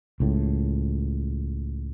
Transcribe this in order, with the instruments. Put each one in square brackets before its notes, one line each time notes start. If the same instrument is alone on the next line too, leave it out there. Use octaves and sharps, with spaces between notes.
[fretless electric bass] C#2 A2